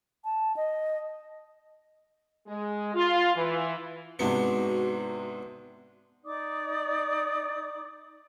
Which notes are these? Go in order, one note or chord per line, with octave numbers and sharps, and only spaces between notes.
A5
D#5
G#3
F4
E3
G#2 C3 B3 D4 F#4 C#7
D#4 D5 D6 D#6